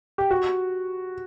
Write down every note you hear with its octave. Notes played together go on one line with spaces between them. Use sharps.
G4
F#4